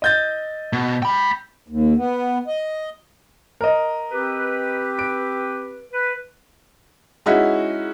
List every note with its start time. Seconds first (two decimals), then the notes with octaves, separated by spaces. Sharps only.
0.02 D#5 G6 A6
0.73 B2
1.02 G5 B5
1.68 D#2
1.97 B3
2.47 D#5
3.61 A#4 D#5
4.11 C4 G4 B4
4.99 D7
5.92 B4
7.26 G#3 C#4 D#4 E4 F#4